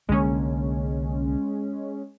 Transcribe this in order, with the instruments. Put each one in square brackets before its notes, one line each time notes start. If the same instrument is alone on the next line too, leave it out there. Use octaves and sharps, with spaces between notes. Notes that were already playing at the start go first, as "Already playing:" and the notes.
[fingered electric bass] C2 D3 A#3 [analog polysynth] G#3 C#4